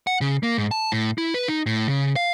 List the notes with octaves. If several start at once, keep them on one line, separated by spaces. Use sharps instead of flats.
F#5
C#3
A#3
G#2
A5
A2
E4
B4
D#4
A2
C#3
F5